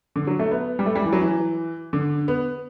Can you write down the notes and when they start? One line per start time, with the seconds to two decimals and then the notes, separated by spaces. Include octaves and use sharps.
0.16 D3
0.27 F#3
0.39 A3
0.51 B3
0.79 G3
0.86 A3
0.95 G3
1.04 E3
1.13 F#3
1.22 E3
1.93 D3
2.28 B3